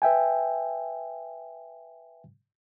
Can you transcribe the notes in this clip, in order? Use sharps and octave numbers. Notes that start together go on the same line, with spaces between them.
B4 E5 G5 G#5